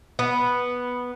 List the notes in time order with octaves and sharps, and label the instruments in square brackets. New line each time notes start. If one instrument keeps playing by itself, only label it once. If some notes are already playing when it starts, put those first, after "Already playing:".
[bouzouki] B3